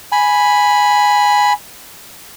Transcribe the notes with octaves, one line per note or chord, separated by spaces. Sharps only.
G#5 B5